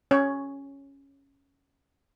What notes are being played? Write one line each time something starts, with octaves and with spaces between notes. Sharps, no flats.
C#4 C#5